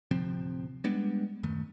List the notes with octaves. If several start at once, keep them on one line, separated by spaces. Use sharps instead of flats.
D1 C3 F3 C4
G3 G#3 B3 D4
D#1 F#2 D#3 A3